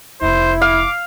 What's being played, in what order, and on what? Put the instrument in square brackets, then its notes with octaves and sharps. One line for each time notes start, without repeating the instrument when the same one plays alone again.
[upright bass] F1 E2 [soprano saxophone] E4 [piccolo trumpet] C5
[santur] F5 [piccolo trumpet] D6